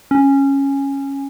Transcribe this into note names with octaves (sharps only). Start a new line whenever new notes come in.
C#4